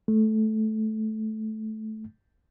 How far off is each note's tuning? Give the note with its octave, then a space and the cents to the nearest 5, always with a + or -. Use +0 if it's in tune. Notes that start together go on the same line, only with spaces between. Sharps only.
A3 -15